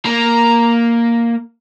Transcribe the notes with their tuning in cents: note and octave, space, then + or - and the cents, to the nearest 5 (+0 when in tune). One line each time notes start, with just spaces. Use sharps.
A#3 +0 A#5 +0